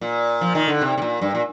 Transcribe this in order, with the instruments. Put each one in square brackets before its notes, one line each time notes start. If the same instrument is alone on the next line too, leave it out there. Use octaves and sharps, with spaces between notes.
[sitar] A#2
F3
D#3
D3
C3
C3
A#2
G2
A#2